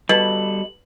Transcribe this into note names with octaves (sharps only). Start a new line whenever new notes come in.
B2 G3 A4 F#7